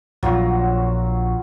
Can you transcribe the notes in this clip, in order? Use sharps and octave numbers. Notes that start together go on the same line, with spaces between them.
A#1 F#3 F4 F#4